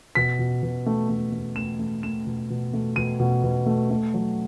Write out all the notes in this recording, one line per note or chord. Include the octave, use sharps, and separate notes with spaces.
B2 B6
B2
B2
A3
A3
A3
A3 E7
A3
A3 E7
B2
B2
A3
B2 D#7
B2
B2
A3
A3
F#3